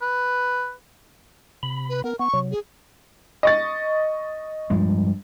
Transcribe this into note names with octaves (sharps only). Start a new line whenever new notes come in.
B4
C3 B5
B4
B3 A#4
B3 C#6
C3 F#3
G#4
D#5 C#6 A6
G2 F3 G#3